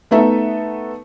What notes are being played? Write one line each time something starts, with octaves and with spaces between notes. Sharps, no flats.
A3 B3 D#4 A4 E5